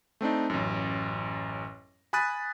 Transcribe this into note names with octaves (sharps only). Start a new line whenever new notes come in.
A3 C4 D4 D#4
A1 F#2
G#5 B5 D#6 F#6 A6 D#7